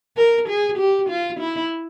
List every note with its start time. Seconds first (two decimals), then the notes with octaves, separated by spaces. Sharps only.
0.17 A#4
0.48 G#4
0.78 G4
1.09 F4
1.40 E4